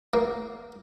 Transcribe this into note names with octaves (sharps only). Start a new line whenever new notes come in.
A#3